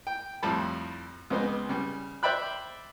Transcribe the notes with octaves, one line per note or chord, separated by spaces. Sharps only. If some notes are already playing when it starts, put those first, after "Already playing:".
G5
F2 A2 F3 G3 A5 B5
C#2 C#3 B3 C5 D#5
C#3 G3
C5 D5 E5 G5 B5 F#6